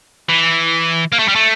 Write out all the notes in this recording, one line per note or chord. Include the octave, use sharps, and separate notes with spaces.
E3
A#3
A3
G3
A3